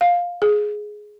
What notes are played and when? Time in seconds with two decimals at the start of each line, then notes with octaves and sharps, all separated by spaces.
0.01 F5
0.42 G#4